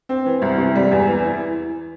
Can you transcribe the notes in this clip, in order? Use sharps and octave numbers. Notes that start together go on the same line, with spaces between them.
C4
E3
C2
C3
G3
E2
E3
E4